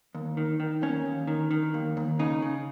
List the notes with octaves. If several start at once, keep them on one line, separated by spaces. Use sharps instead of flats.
D#2
D#3
D#3
D#2 C#4
D#2
D#3
D#3
D#2
D#2
C#3 D#4
C#3